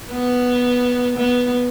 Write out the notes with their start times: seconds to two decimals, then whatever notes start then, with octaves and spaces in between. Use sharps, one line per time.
0.11 B3
1.18 B3